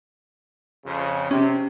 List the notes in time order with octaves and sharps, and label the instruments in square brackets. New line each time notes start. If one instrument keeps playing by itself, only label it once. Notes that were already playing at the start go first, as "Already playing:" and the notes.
[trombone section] F2 C#3
[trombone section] C3 [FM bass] C#4